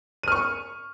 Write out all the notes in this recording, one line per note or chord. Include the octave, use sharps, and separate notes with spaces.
C#6 F6 D#7